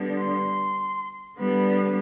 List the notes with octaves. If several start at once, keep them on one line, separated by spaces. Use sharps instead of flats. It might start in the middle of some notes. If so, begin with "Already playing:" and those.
Already playing: D3 G3 B3
C6
D3 G3 B3 B5